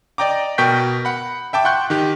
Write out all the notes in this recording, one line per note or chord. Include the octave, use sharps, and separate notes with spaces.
D5 D#5 G5 A#5 D6
B2 A#4 G5 C#6 G6 B6
F#5 B5
E5 G5 A5 D6
F#5 G5 C6 C#6 F#6 G6
D#3 D#4 G4